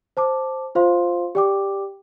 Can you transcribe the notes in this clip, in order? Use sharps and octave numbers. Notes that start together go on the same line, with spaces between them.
C5 A5 D6
F4 C5 F5 C6
G4 D5 G5 D6